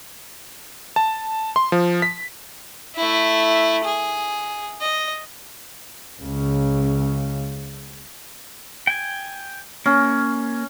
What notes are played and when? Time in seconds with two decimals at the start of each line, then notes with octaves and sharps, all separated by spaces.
0.96 A5
1.56 C6
1.72 F3
2.02 B6
2.96 A3 E4
3.84 G#4
4.81 D#5
6.21 C#2 C#3
8.87 G5 G#5
9.86 A#3 C#4